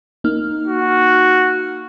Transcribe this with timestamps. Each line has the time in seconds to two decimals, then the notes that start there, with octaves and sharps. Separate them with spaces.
0.24 A#3 D#4 F6
0.67 F#4